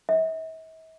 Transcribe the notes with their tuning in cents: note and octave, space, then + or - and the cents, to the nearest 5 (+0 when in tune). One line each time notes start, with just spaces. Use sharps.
E5 -45